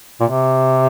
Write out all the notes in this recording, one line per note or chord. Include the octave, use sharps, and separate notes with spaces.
A#2
C3